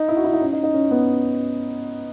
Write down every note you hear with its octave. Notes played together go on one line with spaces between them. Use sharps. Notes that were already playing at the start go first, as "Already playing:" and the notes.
Already playing: D#4
E4
F#4
E4
D#4
C#4
D#4
D#4
C#4
B3